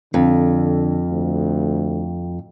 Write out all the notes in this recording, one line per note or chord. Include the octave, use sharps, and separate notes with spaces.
F2 D3
D2